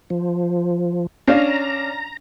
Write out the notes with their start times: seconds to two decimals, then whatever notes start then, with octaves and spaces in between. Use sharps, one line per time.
0.10 F3
1.28 C#4 D4 F5 A#5